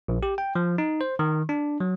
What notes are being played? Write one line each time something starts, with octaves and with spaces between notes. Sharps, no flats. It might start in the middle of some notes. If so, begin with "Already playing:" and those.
A#1
G4
G5
F3
D#4
C5
D#3
D4
F#3